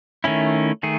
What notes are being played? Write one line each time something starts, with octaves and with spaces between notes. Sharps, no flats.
D#3 A3 C#4 E4
D#3 A3 G#4